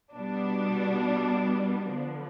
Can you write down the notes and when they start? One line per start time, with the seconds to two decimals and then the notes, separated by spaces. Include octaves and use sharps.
0.13 B2 G3 B3 D4
1.93 D3 F3 B3